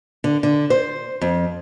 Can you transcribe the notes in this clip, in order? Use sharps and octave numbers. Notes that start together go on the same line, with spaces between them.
D3
D3
C5
F2